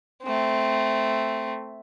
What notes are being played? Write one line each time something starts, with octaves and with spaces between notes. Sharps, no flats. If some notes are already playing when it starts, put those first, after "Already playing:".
A3 C4